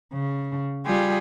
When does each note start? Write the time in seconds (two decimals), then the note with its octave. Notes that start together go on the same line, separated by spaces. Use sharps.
0.14 C#3
0.86 G3 F4 G4 G#4